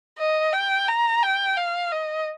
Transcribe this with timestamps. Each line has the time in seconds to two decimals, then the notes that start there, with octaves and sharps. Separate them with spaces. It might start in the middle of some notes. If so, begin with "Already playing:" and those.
0.19 D#5
0.53 G5
0.88 A#5
1.23 G5
1.58 F5
1.92 D#5